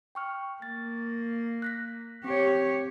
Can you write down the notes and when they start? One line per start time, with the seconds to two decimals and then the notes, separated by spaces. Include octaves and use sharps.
0.15 G5 C#6 F6
0.62 A#3 A6
1.62 F#6 A#6 B6
2.24 C4 G4 C#5